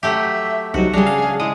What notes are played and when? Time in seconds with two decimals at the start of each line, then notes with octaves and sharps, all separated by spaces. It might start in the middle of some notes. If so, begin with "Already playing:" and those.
0.03 F#3 A3 G4 E5
0.74 C2 C3 F#3 D#4 F#4
0.93 C#3 G3 D4 G#4 A#5
1.07 F5
1.40 G#3 E4 D#6